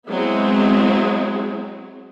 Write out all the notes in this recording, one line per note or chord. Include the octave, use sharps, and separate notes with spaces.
F#3 G#3 B3 C4 E4